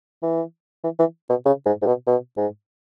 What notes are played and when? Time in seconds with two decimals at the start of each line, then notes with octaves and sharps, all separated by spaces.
0.23 E3
0.84 E3
0.99 E3
1.30 B2
1.45 C#3
1.66 G#2
1.82 G#2
1.87 B2
2.07 B2
2.37 G#2